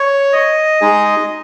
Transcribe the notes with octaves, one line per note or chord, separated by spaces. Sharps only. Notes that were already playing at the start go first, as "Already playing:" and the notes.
Already playing: C#5
D#5
G#3 D#4 G#4